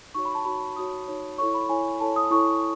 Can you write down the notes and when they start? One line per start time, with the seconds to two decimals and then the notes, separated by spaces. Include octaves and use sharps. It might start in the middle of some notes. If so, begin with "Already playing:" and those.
0.14 D#4 F#4 C#5 C#6
0.25 B5
0.35 A5
0.45 D#4 F#4 C#5 B5
0.76 D#4 F#4 C#5 D#6
1.08 D#4 F#4 C#5
1.38 E4 A4 C#5 C#6
1.54 B5
1.69 E4 A4 C#5 G#5
2.00 E4 A4 C#5 A5
2.16 D#6
2.31 E4 A4 C#5 C#6